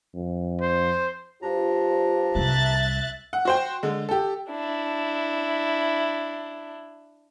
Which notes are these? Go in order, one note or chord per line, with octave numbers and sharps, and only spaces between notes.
F2
C5
G2 D4 F4 G4 C5 A#5
C2 G3 E5 F#6 A6
F#5
F#4 C5 G5
D3 G#3
G4 A4
D4 E4